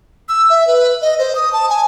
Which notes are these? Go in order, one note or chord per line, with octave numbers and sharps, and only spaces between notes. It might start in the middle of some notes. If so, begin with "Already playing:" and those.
E6
E5
B4
D#5
C5
D#6
A5
G#5